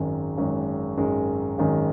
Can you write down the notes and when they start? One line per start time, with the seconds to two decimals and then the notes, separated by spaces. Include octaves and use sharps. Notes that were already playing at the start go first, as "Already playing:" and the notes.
Already playing: G#1 F#2 D#3 G#3
0.37 G#1 F#2 D#3 G#3
0.97 G#1 F#2 D#3 G#3
1.58 G#1 F#2 D#3 G#3